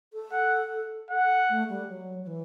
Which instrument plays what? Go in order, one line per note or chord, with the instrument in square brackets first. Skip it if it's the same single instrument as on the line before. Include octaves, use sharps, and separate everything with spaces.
[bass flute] A4
[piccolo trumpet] F#5
[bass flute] A4 [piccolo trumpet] F#5
[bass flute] A3
G3
F#3
F#3
E3